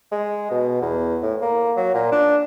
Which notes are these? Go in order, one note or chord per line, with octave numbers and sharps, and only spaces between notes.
G#3
B2
E2
A2
A#3
F#3
A#2
D4